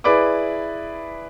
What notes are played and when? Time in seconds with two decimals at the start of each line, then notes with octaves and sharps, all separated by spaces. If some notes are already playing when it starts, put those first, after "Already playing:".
0.04 E4 G#4 B4 D5 B5 D6